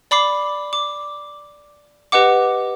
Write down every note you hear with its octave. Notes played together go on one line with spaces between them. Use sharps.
D5 B5 D6 C7
D6
G4 B4 D#5 F#5 D6